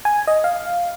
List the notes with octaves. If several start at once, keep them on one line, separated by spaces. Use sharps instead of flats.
G#5
D#5
F5